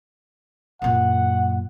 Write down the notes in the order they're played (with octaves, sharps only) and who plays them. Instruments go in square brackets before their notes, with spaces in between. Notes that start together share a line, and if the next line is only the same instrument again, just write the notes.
[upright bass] F#2 A#2 [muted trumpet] F#5